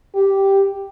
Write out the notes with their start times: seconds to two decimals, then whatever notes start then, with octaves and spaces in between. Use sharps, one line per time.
0.15 G4